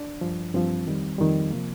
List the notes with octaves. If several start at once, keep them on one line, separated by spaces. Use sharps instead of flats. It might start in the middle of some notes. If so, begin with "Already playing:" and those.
Already playing: D4
G2 F3
G2 F3 C4
F2 D#3 G3
F2 D#3 G3
C3 F3 A#3